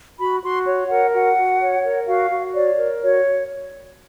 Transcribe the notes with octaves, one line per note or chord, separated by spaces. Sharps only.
F#4 B5
F#4 C6
C#5
A#4 F#5
F#4 F#5
F#4
C#5
A#4
F#4 F5
F#4
C#5 D5
A#4
F#4 C#5